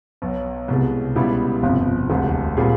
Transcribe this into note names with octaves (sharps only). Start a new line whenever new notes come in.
B1 B2 F#3
C2 B2 G#3
C#2 B2 G3 B3 E4
G1 F2 C3 F3
E1 D2 C3
A#2 G3 C4 F4 G#4